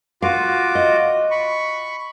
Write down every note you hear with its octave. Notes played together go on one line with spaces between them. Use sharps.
F4 F#4 F5 D6
D#5
B5 C#6